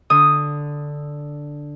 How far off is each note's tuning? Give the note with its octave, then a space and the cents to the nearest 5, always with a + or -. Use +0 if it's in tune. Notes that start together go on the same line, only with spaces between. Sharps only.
D3 +0 D#6 +0